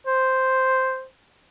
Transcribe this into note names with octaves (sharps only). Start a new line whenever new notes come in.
C5